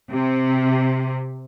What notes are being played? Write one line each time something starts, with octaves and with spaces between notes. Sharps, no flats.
C3